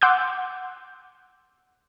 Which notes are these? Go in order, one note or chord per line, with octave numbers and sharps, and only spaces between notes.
F#5 C6 D6 E6 F#6 G6